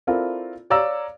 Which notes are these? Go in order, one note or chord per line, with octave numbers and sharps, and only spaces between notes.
C4 E4 F4 A4 A#4 D5
C#5 D5 F5 A#5 E6